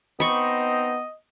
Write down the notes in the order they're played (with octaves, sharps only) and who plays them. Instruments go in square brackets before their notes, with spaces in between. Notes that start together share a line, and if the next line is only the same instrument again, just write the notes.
[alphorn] B3 [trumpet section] C4 D#4 [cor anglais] D#5 [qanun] B5 C#6